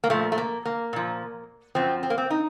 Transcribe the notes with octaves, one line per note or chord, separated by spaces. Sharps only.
A#3
A#2 F3 A3
A3
A#3
A#3
A#2 F3
F#2 F3 C4
C4
A#3
C4
D#4